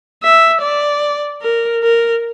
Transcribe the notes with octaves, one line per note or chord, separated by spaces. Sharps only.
E5
D5
A#4
A#4